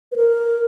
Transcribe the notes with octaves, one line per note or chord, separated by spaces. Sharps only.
B4
A#4